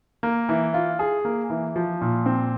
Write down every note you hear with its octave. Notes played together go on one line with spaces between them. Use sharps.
A#3
E3
F4
G#4
A#3
E3
F3
A#2
C4